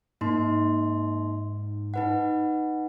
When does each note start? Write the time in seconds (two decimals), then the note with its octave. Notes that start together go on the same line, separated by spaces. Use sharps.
0.21 G#2 A#3 D#4 C6
1.94 D#4 B4 F#5